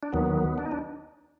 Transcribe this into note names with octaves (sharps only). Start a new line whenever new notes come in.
D4
D#2 D#3 F#3 B3
D4
D#4
D4